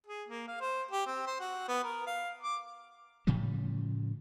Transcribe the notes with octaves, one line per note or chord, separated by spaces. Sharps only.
G#4
A#3
F5
C5
G4
C4
C5
F#4
B3
A#4
F5
D6
A2 C#3 F3 G3